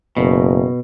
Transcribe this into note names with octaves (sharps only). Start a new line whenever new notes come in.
F#1 B2